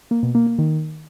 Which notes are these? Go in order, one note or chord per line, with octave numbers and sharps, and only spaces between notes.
A#3
B2
A#3
A#3
D#3